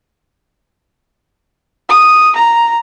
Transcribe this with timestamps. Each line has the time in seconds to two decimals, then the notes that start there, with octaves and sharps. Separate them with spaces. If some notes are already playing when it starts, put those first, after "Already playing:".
1.89 D#6
2.36 A#5